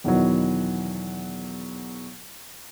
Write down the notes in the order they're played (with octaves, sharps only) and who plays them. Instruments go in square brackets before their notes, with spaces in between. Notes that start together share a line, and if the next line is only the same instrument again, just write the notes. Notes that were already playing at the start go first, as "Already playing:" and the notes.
[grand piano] E2 B2 D#3 E3 F#3